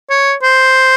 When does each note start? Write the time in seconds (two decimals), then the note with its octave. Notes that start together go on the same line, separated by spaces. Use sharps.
0.10 C#5
0.43 C5